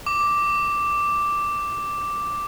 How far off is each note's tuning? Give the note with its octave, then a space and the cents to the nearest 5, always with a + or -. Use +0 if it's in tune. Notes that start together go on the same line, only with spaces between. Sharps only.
D6 +0